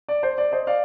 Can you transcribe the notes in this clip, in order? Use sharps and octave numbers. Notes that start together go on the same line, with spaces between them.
D5
C5
D5
C5 D#5
D5 F5